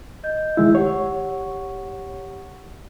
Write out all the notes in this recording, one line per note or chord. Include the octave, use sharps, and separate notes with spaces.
D#5 G6
D#3 G#3 E4 E6
G4 C#5 F#5 C#6